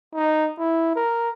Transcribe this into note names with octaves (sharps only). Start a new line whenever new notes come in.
D#4
E4
A#4